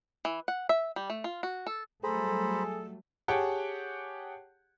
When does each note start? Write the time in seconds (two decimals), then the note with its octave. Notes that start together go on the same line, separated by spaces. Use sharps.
0.25 E3
0.48 F#5
0.69 E5
0.96 G3
1.10 A3
1.24 F4
1.43 F#4
1.67 A4
2.04 F#3 G3 A3 G#4 A4 C5 A#5 B5
3.28 G4 G#4 C#5 F#5 G5 A5